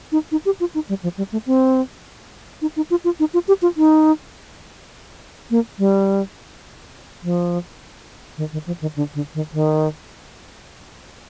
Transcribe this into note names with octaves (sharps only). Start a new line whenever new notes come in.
D#4
D#4
G4
F4
D#4
G3
F3
G3
A3
C4
D#4
D#4
F4
F4
D#4
F4
G4
F4
D#4
A#3
G3
F3
D#3
D#3
F3
D#3
D3
D3
D#3
D#3